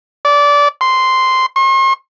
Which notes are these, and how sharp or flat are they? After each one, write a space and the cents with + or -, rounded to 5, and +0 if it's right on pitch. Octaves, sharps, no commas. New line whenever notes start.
D5 -20
C6 -5
C6 +45